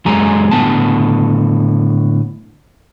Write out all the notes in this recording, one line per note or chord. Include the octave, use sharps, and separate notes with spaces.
F#2 F#3 G#3 G#4 G#5 A#5
A2 D3 B3 G#5 A5